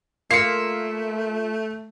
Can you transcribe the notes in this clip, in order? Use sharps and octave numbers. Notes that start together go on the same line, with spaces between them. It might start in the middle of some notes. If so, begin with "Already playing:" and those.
A3 A#3 F4 E5 F5 C7 C#7